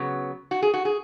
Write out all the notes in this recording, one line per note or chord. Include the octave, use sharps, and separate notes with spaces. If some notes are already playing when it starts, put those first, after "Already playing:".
Already playing: C#3 F#3 B3
F#4
G#4
F#4
G#4